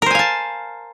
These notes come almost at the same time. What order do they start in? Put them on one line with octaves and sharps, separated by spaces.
A#4 C5 G#5 F5 A5